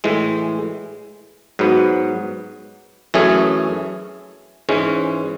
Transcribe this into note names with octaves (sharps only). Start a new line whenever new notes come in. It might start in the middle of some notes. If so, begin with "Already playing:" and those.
A2 E3 G#3
G#2 F#3 B3
F#2 E3 A3 C#4 G#4
G#2 E3 G#3 C#4